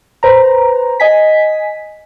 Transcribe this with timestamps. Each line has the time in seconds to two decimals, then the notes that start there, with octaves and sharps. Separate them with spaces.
0.23 B4 C5 A#5
1.00 D#5 G#5 B6